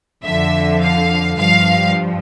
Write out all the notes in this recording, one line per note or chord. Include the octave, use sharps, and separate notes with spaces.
F2 D3 F3 E5
F5
G2 F3 F5